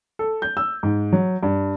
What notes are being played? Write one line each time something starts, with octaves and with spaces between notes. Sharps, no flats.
A4
G6
E6
G#2
F#3
G2